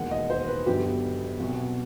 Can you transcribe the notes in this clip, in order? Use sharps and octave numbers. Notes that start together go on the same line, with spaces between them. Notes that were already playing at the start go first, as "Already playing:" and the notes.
Already playing: E1 D#2 D#3 F#5
D#5
C5
B4
G1 G2 F#3 B3 G4
C2 B2 F#3 F#4